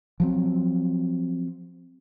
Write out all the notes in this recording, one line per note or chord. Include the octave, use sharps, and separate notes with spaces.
F3 F#3 C4